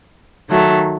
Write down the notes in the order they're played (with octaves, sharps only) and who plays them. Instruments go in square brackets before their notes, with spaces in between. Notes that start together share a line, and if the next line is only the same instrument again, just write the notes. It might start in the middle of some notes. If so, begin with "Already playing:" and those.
[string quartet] D#3 F#3 A3